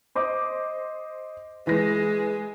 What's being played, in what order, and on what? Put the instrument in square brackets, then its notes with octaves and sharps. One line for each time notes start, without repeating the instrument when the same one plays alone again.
[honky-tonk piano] C5 D#5 D6
[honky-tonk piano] E3 A#6 [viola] G#3